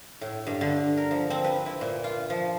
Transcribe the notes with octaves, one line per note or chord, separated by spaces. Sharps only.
A2
G2
D3
A#4
F3
C4
B4
E4
A#2
F4
F3